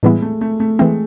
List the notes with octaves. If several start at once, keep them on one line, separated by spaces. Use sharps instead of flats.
A2 E3 G3 G#3 B3 E4
A3
A3
A3
E3 G#3 A3 C4